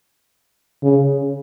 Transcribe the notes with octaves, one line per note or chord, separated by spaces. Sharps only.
C#3